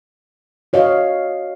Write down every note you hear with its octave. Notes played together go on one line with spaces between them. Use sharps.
F#4 C#5 D#5 F5